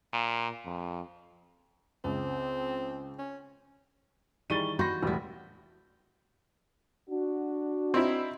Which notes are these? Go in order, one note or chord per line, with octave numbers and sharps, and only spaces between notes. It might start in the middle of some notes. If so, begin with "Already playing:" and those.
A#2
F2
C#2 C4
C#4
D#3 E3 G3 G#4 C#6 A6 D#7 G7
F#4 B5 C6 G6 A#6
E1 A2 G3 B3 E4
D4 F#4
C4 D#4 E4